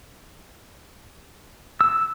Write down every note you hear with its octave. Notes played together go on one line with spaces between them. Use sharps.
E6